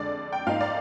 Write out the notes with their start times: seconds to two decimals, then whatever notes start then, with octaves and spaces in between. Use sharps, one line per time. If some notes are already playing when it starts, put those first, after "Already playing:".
Already playing: F2 D3 G#3 D5
0.33 G5
0.47 G#2 F3 A#3 D#4 F5
0.61 D5